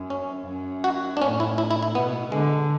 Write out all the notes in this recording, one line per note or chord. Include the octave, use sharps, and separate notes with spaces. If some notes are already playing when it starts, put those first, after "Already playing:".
Already playing: F#2
C#4
F#2
F#4
D4
A2 C#4
E4
E4
E4
E4
B2 B3
D3 G#3